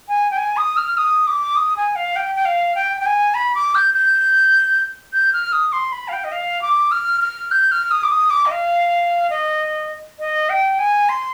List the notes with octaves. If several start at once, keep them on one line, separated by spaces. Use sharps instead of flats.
G#5
G5
G#5
D#6
F6
D#6
D6
D#6
G#5
F5
G5
G5
F5
G5
G5
G#5
B5
D6
G6
G6
G6
F6
D#6
C6
B5
F5
G5
D#5
F5
D6
F6
F6
G6
F6
D#6
D6
D#6
D6
D#5
F5
D#5
D#5
G5
G#5
C6